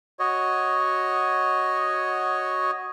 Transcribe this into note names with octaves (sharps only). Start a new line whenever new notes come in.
F#4 C#5 D#5